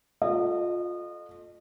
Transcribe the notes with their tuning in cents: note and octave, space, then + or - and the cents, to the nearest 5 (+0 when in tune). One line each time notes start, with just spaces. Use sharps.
F4 +20 A4 -10 D#5 -30